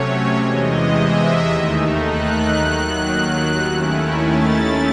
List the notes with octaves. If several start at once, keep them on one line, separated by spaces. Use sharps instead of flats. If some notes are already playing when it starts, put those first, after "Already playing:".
Already playing: C3 F#3 A3 C#4 C#5
E2 C3 E3 G#3 D#5
E5
D#2 D#3 A3 D#4
F#6
D#2 D#3 F#3
D#2 D#3 A3 C#4 E4
A6